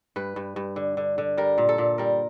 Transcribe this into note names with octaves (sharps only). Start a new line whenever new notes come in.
G2 B4
G2
G2
D3
D3
D3
G3 A#4
A#2
A4
A#2
G3 A#4